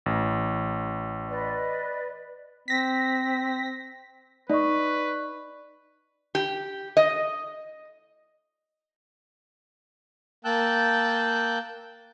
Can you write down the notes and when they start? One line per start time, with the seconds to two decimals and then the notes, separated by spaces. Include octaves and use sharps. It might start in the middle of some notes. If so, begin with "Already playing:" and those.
0.06 A1
1.28 B4 D5 D#5
2.68 C4 A#6 B6
4.49 D#4 B4 D5 C#6
6.35 G4
6.97 D#5
10.45 A#3 G5 A5 E6 F#6 G6